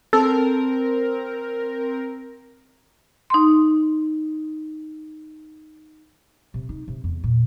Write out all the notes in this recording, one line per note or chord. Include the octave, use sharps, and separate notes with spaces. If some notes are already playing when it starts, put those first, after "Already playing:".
C4 A4 A#4
D#4 C6
C3
D#4
C3
E2
A#2